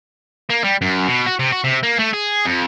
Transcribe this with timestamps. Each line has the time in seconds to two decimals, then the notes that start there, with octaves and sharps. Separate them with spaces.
0.50 A#3
0.64 G3
0.82 F#2
1.07 B2
1.26 F#4
1.39 C3
1.52 F#4
1.64 C3
1.83 A#3
1.99 A3
2.13 G#4
2.45 F2